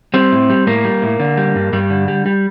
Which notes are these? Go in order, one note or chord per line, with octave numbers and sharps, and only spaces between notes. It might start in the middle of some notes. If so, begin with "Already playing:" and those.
G3 C4
A2
G3
A2 A#3
G3
A2
D3
G3
G2
G2 G3
D3
G3
G3